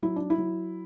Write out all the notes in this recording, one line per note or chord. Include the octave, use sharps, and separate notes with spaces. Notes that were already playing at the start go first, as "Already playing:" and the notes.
F#3 E4
D4
E4
F#3